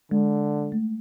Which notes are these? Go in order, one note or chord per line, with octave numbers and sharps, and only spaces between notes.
D3 G#3
A3